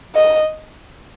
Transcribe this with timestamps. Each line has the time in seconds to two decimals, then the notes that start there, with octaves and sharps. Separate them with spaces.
0.15 D#5